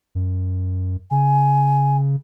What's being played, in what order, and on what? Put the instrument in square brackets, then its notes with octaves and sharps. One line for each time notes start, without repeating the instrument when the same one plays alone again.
[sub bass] F#2
[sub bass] C#3 [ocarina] G#5